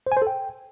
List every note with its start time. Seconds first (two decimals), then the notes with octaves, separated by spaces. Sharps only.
0.07 C5
0.12 G#5
0.17 C5
0.22 A4
0.27 G5